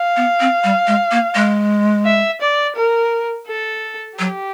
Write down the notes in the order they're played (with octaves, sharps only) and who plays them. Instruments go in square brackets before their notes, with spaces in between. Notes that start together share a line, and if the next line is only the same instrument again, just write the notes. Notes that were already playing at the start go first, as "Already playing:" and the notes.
Already playing: [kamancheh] F5
[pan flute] B3
C4
G3
G#3
A#3
G#3
[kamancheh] E5
D5
A#4
A4
[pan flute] F#3 [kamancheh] G4